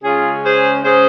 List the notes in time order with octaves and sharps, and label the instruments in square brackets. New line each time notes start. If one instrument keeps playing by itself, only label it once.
[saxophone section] C#3 G#3 C#4 F4 G#4
G#4 C5
C#3 G#3 C#4 G#4 C5